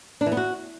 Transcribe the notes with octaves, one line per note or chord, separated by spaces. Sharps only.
D4
E3
B3
F#4